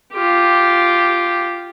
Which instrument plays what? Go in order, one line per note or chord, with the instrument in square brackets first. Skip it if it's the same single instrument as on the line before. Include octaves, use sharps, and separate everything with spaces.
[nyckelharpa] F4 G4